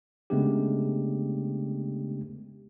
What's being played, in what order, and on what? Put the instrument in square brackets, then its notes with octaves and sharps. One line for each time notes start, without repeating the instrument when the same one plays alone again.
[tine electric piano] C#3 G#3 A3 B3 D4 G4